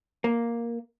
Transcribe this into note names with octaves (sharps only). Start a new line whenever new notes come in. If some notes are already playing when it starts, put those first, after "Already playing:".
A#3